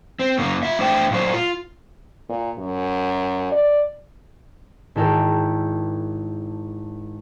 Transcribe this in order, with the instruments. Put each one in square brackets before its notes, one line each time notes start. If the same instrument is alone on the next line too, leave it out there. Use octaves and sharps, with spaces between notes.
[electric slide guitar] C4
F#2 C#3 A#3
F4 E5
A3 D4 C5 E5 G5
A#2 F#3 C5
F4
[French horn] A#2
F#2
D5
[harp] G#1 E4 A4 A#4 G5